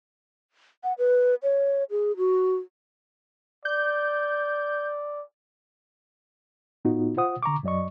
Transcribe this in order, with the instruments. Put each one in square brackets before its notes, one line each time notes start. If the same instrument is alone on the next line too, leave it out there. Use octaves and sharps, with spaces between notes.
[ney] F#5
B4
C#5
G#4
F#4
[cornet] D5 [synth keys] G6
[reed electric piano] A2 B3 D#4 F4 F#4
F4 C5 F#5 D#6
D3 A#5 C#6 D6
F#2 F#3 D5 D#5 C#6